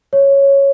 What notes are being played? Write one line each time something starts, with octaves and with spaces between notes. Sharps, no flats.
C#5